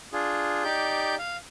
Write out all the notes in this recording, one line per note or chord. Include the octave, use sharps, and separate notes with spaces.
D4 F4 G#4
D#4 G4 D5 G6
F5